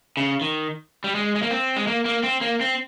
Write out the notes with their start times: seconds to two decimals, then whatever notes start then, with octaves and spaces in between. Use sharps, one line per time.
0.17 C#3
0.41 D#3
1.04 G3
1.15 G#3
1.35 G#3
1.43 A#3
1.51 C4
1.76 G#3
1.87 A#3
2.05 A#3
2.23 C4
2.41 A#3
2.61 C4